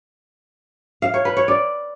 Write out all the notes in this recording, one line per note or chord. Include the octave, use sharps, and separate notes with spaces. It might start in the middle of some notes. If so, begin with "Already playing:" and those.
F5
C#5
B4
C#5
D5